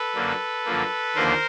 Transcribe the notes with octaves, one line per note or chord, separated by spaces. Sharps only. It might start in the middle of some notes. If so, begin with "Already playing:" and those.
Already playing: A4 B4
F#2 D3 F#3 A#3
F#2 D3 F3 A#3
D#2 D3 F3 A#3 A#4 C5